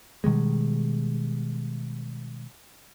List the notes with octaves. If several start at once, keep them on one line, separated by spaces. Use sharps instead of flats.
B2 D#3 G3 G#3